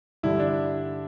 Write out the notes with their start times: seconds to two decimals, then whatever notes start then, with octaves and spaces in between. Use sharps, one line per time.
0.23 G2 D3 G3 E4
0.39 D4